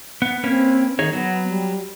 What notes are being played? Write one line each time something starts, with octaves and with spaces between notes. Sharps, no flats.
B3
A#3 C4 C#4 B4
D#3 D#4 G#4 C#5
F#3 B3
G3